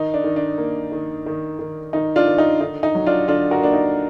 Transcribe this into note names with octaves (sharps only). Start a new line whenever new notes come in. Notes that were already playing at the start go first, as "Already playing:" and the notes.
Already playing: D#3 D#4
D4
D#3
D4
A#3
D#3
D#3
D#3
D#3 D#4
D4 F4
D#3
D#4
D3 D#4
D#4
F#3
D4 F4
D3 D4 F4
F#4 A#4
A#3 D4
D#4